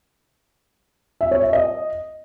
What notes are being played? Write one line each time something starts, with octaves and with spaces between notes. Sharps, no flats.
E5
C#5
E5
D#5